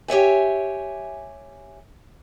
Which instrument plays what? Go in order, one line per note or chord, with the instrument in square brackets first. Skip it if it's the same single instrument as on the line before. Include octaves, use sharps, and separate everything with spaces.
[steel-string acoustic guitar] G4 C#5 E5 G#5